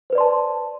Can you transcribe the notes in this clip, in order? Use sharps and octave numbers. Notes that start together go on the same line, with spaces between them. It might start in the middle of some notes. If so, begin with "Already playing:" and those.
B4 C5 D5 A5 C6